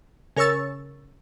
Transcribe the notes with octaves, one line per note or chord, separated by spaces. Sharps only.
C#3 A#4 C#5 C#6 E6 A6